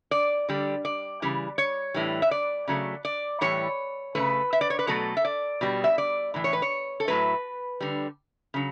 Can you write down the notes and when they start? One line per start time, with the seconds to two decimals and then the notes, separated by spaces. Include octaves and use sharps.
0.11 D5
0.49 D3 G3
0.85 D5
1.22 C#3 E3 G3
1.58 C#5
1.94 A2 E3 G3
2.22 E5
2.31 D5
2.68 C#3 F#3 A3
3.05 D5
3.41 A2 E3 G3 C#5
4.15 C#3 E3 A3 B4
4.53 E5
4.61 D5
4.70 C#5
4.79 B4
4.87 B2 F#3 A3 A4
5.17 E5
5.25 D5
5.61 B2 G3
5.84 E5
5.98 D5
6.34 A2 E3
6.44 C#5
6.53 B4
6.62 C#5
7.00 A4
7.08 A2 F#3 A3 B4
7.80 D3 G3
8.54 C#3 F#3